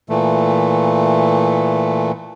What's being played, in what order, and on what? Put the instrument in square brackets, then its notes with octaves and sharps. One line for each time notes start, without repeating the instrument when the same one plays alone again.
[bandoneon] A#2 E3 A3